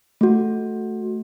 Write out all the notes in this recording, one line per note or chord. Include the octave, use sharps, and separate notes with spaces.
A3 F#4